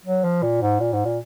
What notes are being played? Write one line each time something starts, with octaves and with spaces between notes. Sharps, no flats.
F#3
F3
A#2
G#2
A#2
G#2
A#2